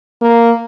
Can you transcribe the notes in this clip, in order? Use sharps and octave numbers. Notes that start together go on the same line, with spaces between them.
A#3